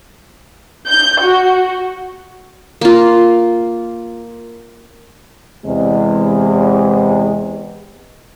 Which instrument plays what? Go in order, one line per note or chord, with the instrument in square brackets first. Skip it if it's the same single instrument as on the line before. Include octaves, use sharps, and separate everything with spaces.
[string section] G6
F#4
[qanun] A#3 F4
[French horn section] E2 C3 G#3